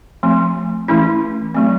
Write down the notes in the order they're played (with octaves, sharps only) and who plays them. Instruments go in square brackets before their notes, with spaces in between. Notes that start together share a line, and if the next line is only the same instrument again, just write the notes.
[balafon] F3 A3 C4
E3 A3 C#4 E4
F#3 A3 C4